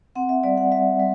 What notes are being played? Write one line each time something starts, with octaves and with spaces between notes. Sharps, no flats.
C4 F#5
E5
G3 D5
F#5
G3 E5
G3